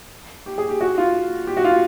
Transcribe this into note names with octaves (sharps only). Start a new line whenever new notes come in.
G4
G#4
G4
F#4
F4
G4
F#4
F4